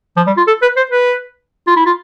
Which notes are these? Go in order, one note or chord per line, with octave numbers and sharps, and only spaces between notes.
F3
G3
F4
A4
B4
C5
B4
F4
E4
F4